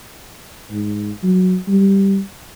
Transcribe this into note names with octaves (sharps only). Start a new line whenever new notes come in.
G#2
F#3
G3